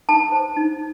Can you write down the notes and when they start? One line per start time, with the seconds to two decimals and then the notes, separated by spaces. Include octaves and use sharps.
0.09 D#4 A5
0.32 C5
0.57 D#4